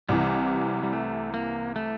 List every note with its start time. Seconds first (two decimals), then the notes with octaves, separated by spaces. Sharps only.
0.09 C2 C3 E3 G3
0.83 G3
0.93 A3
1.34 A#3
1.76 A3